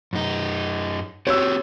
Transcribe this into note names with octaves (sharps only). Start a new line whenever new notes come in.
F#2 D#4
C4 F#4 G4 C#5 E6